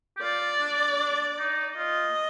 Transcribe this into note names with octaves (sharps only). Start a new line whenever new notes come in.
G4
F4 D5
D4
D4
D#4
F4 D#5